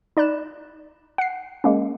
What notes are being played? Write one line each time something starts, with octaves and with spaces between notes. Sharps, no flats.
D#4 D5 B5 F#6 E7
F#5 C7
G#3 A#3 C#4